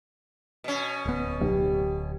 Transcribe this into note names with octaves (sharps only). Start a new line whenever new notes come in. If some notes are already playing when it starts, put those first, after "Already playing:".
B2 C#4
D1 B3
B1 G4